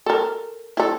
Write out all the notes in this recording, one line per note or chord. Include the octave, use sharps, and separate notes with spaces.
A4 A#4
E4 A4